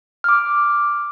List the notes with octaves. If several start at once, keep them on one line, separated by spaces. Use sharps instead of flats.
D6 F6